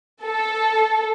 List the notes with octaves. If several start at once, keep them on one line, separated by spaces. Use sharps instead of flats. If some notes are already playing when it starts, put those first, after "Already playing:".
A4